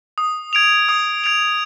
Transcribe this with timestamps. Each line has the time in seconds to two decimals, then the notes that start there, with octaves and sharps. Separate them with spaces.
0.18 D#6
0.53 G#6 D7 F7
0.89 D#6
1.24 G#6 D7 F7